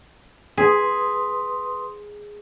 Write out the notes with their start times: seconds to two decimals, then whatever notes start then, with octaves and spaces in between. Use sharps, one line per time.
0.58 G#4 B4 C6 D#6